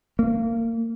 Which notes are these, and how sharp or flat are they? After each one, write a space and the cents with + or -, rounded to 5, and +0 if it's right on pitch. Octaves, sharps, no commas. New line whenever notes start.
A#3 -25